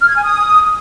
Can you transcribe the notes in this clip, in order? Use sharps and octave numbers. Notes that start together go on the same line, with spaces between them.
F6
G#6
G#5
D#6